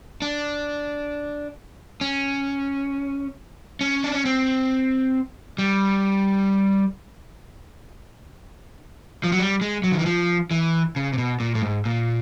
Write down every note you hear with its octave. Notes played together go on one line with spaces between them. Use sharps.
D4
C#4
C#4
D4
C#4
C4
G3
F3
F#3
G3
G#3
F#3
D#3
E3
F3
E3
C#3
C3
B2
A#2
A2
G#2
A#2